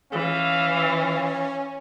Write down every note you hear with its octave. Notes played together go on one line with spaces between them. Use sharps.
E3 C#4 F5